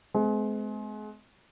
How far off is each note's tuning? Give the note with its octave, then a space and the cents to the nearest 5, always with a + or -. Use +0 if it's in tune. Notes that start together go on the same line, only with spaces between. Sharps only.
G#3 +35 C4 -40